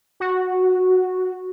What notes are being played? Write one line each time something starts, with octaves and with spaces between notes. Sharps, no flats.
F#4